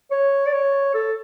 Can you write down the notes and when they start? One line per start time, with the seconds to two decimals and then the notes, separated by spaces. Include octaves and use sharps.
0.11 C#5
0.46 D5
0.53 C#5
0.94 A4